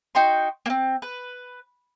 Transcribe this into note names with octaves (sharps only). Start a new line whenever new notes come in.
D#4 F#4 G5 C6
A#3 C4
B4